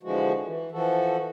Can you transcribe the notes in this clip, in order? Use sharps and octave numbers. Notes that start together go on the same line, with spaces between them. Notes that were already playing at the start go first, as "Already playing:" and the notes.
D3 E3 F3 G#3 F#4
E3
E3 F3 F#4 A4